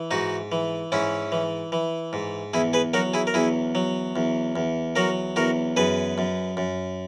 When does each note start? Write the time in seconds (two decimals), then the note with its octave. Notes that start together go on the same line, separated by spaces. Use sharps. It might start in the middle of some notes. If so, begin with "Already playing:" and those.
Already playing: E3
0.11 G#2 D#4 F#4
0.52 E3
0.92 G#2 C#4 E4
1.32 E3
1.72 E3
2.13 G#2
2.53 E2 E4 G#4
2.73 G#4 B4
2.93 F#3 F#4 A#4
3.14 E4 G#4
3.27 A#4
3.34 E2 E4 G#4
3.75 F#3
4.16 E2
4.56 E2
4.96 F#3 F#4 A#4
5.36 E2 F#4 A#4
5.77 F#2 G#4 B4
6.18 F#2
6.57 F#2